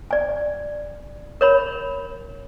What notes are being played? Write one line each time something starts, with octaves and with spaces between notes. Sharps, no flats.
D5 G#5
A#4 C#5 B5